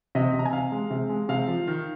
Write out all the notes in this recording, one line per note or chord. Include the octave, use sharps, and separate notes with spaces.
C3 D#5
C3
A#5
G#5
C3 F5
G#3
C3
G#3
C3 F5
F3
D#3